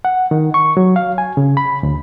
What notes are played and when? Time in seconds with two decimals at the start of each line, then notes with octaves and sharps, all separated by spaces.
0.05 F#5
0.31 D#3
0.54 C#6
0.77 F#3
0.96 F5
1.18 G#5
1.37 C#3
1.57 B5
1.83 D2